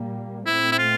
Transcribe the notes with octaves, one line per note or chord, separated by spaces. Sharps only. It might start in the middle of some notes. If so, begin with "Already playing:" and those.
Already playing: A#2 G3 A#3
A#2 A3 C4 E4
E4
F4